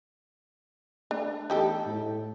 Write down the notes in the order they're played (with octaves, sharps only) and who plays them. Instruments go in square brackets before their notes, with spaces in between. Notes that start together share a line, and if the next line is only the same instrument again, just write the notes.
[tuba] A3 [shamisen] D4
[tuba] E2 [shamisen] D#4 G4 A4
[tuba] A2